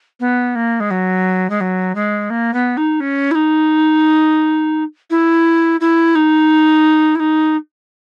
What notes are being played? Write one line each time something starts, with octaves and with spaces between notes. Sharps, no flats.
B3
A#3
G#3
F#3
G#3
F#3
G#3
A#3
B3
D#4
C#4
E4
D#4
E4
E4
D#4
E4
D#4